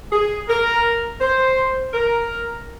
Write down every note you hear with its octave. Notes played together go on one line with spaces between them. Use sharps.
G#4
A#4
C5
A#4